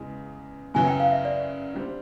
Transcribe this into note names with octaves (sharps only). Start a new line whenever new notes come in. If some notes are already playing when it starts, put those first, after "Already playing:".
Already playing: E2 C#3 E3 G#3
F#2 C#3 F#3 B3 E4 G#5
G5
F5
E5
D5
D3 G3 C4